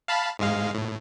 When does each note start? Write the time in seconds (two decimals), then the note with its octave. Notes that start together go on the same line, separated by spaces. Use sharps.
0.08 F5 A5 B5
0.39 G#2 G#3 F5
0.75 A2